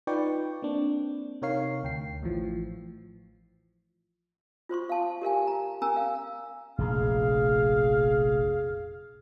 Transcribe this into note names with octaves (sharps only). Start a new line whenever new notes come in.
D#4 F4 B4 D5 G5 C#6
A#3 C4 D4
C3 D#4 A#4 C#5 F5 C7
D2 G5 C7
A1 A2 E3 F3
F4 C5 C6 C#6
F5 A5
G4 A#4 F5 G#5
A#5
C#4 A#4 G#5 A#5 E6
F5
F1 A#1 G#4 F5